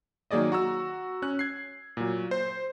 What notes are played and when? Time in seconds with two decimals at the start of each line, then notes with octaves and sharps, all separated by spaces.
0.31 D#3 F#3 A#3 G#4 D5 D#5
0.52 F#4 A#5 E6
1.22 C#4 F#6
1.39 G#6 C7
1.97 A#2 F#3
2.31 C5